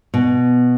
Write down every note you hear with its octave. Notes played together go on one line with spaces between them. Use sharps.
B2